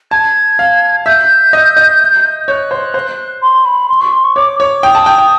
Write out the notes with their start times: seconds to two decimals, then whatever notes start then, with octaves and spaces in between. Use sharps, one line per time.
0.11 A5 G#6
0.59 F5
1.06 E5 G6
1.53 D#5
1.77 D#5
2.48 C#5 F#6 G6
2.71 C5
2.94 C5
3.42 C6
3.65 B5
3.89 C6
4.01 C#6
4.12 C6
4.24 C#6
4.36 C#5 D6
4.59 C#5 D6
4.83 G5 D#6
4.95 A5
5.06 G5
5.18 G5